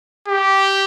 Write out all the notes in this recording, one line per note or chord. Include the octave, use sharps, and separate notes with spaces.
G4